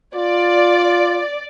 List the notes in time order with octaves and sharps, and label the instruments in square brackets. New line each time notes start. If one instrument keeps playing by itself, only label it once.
[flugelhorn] F4 [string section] D5